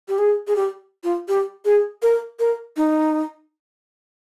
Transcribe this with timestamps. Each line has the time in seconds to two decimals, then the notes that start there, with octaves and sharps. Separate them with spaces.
0.09 G4
0.18 G#4
0.47 G#4
0.56 G4
1.04 F4
1.28 G4
1.65 G#4
2.03 A#4
2.40 A#4
2.77 D#4